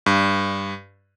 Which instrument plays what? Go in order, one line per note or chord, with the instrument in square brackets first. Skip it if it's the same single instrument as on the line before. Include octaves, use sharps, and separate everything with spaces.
[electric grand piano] G2